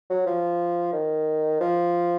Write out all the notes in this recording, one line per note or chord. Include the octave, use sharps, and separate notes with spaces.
F#3
F3
D#3
F3